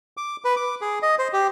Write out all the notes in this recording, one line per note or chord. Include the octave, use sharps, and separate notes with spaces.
D6
B4
D6
G#4
D#5
C5
G4